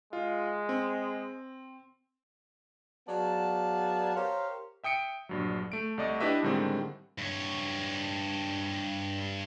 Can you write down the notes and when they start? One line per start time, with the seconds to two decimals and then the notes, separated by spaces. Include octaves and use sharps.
0.13 G#3 F4
0.69 C4
3.08 F#3 B3 G#4 D5 F5 A5
4.16 G4 A#4 C5 C#5 F5
4.84 E5 G5 D#6 C#7 D7
5.29 A#1 G2 F#3
5.72 A3 D7
5.98 C2 A3 D5 D#5 C#6
6.20 D4 E4 G4 B4 D#5 E5
6.43 A2 D3 D#3 G3 G#3 C4
7.18 G2 C#5